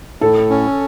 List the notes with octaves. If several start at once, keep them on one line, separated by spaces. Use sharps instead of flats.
A2 A4
C#4